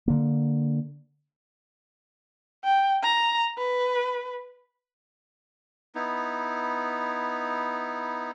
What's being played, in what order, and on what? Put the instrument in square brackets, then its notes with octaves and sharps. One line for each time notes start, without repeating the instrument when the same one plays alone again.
[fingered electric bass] D3 A#3
[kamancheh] G5
A#5
B4
[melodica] B3 D#4 E4